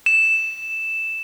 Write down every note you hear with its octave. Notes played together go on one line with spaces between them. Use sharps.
E7